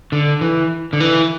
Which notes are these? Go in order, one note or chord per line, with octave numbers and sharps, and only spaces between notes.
D3
E3
D3
E3